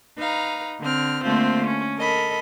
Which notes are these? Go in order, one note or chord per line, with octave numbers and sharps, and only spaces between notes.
D#4 B4 F5 A#5
D3 C4 F6
D3 A3 A#3 C4 F4 C5
C#4
A4 A#4 D#5 B5